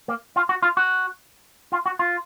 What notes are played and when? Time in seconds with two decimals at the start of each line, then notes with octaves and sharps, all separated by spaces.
0.08 A#3
0.36 F4
0.49 F#4
0.62 F4
0.77 F#4
1.72 F4
1.86 F#4
1.99 F4